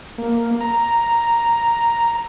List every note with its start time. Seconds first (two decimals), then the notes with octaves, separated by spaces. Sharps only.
0.18 A#3
0.61 A#5